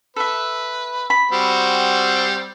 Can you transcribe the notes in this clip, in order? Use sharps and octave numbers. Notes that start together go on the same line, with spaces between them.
A4 B4 E5
B5
G3 C4 F#4